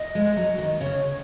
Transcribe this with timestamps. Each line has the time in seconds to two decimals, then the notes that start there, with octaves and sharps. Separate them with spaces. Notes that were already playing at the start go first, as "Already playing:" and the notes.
Already playing: D#5
0.15 G#3
0.37 F#3
0.58 D#3
0.80 C#3 C#5